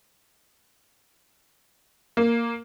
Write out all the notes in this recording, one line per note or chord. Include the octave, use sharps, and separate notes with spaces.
A#3